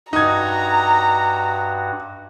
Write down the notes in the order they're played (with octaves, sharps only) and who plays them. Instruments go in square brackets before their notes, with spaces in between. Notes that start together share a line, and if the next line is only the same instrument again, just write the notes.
[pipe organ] G2 F#4 [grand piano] D#4 G#6 [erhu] A#5